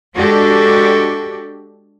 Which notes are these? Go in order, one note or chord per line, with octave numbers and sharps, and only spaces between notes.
G#3 D4 F#4 G4 A4